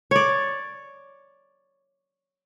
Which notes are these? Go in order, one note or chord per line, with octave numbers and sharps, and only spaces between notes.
C#5 D5